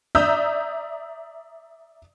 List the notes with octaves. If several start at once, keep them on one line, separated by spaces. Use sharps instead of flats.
D5 E5 A#5 D#6 E6 G6